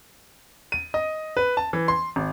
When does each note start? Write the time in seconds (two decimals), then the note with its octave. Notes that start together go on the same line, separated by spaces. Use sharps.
0.72 D#7
0.94 D#5
1.37 B4
1.57 A5
1.73 E3
1.88 C6
2.16 G#1